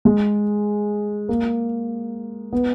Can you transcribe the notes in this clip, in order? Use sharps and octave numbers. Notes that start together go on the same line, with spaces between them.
G#3
A#3
B3